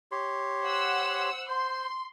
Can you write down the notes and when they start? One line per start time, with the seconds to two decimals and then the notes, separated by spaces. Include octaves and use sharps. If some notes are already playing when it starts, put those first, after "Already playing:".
0.12 G4 C#5 C6
0.64 C5 F#5 E6
1.49 C5 C6